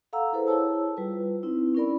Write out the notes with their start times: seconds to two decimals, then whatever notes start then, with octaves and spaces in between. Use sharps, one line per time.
0.13 A4 F5 F#5 A#5 E6
0.33 E4 G#4 A4 B4 C5
0.47 E4 G#4 C#5 A5 E6
0.97 G3 F4 B4
1.43 C4 D#4 E4
1.75 C#4 E4 A#4 D5 B5